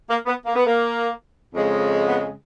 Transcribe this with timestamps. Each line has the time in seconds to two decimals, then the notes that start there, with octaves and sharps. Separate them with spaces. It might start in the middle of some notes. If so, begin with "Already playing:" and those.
0.08 A#3
0.26 B3
0.45 A#3
0.54 B3
0.65 A#3
1.53 F2 C#3 G#3
2.08 B3